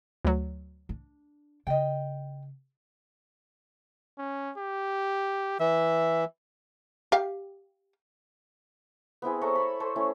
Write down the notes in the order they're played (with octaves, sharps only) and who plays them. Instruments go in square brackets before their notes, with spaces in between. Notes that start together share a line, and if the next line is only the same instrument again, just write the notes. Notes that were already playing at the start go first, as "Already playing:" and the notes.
[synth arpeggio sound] D2 F#3
[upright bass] D4
[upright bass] C#3 [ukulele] D#5 G5
[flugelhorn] C#4
G4
[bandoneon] E3 [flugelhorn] E5
[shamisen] G4 F5
[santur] B3 C4 E4 G#4
A4 C#5 E5 A#5
B5 C#6
A4 C5 C#5 D#5
A3 C#4 E4